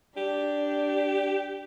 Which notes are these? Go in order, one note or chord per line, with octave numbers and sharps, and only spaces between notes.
D4 G4